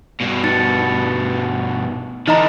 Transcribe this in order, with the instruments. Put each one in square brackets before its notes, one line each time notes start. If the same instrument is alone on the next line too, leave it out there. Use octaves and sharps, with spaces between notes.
[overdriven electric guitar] G2 B2
[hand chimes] D#4 A6 C#7
[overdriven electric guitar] D3 E3 [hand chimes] D#4 D#5 A#5